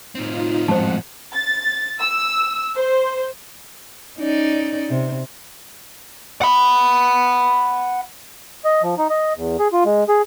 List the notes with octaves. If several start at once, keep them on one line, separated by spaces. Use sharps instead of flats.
A2 C4 D#4 F4
F2 G#2 F3 C5 F#5 A5
A6
E6
C5
C#4 D#4 D5
C3
F#5 B5
D#5
F3
D#4
D#5
E2
G#4
F4
G#3
G#4